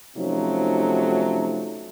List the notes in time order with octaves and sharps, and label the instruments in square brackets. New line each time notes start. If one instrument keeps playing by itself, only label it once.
[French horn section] C3 F3 F#3 A3 C#4 D#4